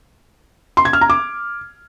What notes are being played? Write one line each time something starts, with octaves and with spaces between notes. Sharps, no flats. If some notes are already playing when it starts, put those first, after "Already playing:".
C6
G#6
F6
A#5
D6